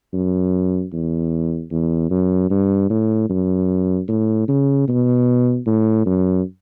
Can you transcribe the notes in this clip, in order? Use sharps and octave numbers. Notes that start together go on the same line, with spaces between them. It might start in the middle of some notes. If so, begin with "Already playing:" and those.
F#2
E2
E2
F#2
G2
A2
F#2
A2
C#3
B2
A2
F#2